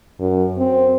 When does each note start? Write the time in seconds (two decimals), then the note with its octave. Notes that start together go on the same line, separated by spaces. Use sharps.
0.20 F#2
0.58 C4